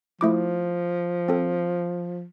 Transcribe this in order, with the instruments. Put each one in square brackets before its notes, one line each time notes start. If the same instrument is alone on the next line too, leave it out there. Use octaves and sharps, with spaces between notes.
[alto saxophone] F3 [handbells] A3 E4 D6
[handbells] C4 A4